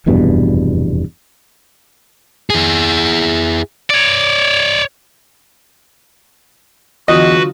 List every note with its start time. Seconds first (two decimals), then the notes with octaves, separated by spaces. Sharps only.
0.06 F1 E2 G2 B2
2.50 E4 G#4
3.90 C#5 D5
7.08 E2 D3 F#3 F4 F#4 B4 D#5